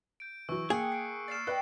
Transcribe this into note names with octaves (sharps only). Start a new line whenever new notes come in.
G6 D7
E3 F#3 C#6 E6
A#3 G#4 G5 D#6 F#6 C#7
G#5 C7 D7
D5 F6 A6 C7 E7
B4 D5 D#5 G5 F#6